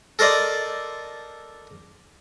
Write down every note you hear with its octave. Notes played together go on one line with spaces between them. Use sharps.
A4 A#4 C5 D5 D#5